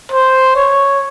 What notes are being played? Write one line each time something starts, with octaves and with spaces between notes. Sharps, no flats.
C5
C#5